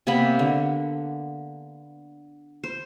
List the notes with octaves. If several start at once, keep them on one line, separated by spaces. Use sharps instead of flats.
C3 A#3 B3 B5
D3
C5